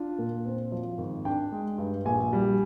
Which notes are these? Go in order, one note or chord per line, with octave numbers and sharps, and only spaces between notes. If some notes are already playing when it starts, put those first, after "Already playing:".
Already playing: D4 F4
A#2
C4
F3
G#1
D4 G5
G#3
G2
A#1 G#5
G3